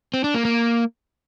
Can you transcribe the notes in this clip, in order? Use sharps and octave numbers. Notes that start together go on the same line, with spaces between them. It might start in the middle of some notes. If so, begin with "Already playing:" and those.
C4
D4
A#3
A#3